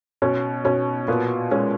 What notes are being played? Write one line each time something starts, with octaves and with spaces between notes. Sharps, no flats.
B2 C#4
B2 C#4
A#2 B3
G#3 C#4